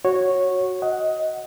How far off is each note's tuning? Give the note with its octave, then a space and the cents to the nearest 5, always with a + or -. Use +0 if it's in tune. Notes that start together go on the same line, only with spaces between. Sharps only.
F#4 +0 C#5 -10
D#5 +15 F#5 +0